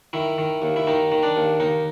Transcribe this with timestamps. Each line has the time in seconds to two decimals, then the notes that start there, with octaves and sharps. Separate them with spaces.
0.13 D#3 E4
0.38 D#3
0.62 D#2
0.76 E4
0.87 D#3 D#4
1.12 D#3
1.23 D4
1.36 D#2
1.60 D#2 D#4